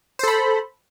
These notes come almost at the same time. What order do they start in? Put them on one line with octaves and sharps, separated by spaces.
C5 A4 B5